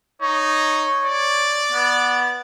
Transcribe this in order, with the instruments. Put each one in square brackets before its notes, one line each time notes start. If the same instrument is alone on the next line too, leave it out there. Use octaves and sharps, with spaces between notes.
[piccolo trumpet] D#4 [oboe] C#5
[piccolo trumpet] D5
[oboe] B3